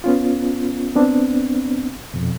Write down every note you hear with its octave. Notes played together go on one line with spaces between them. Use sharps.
B3 C#4 F4
B3 C4 D4
F2 B2